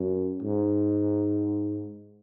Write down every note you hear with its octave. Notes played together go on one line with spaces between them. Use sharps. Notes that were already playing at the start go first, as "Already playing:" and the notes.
Already playing: F#2
G#2